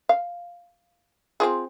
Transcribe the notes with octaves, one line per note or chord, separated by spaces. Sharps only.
F5
C4 F4 G#4